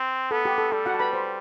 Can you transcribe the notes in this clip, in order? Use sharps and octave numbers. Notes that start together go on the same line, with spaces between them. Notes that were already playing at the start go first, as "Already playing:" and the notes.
Already playing: C4
B3 A4
G4
A4
G3 A4
F#4 F#5
A5
B4 B5
C5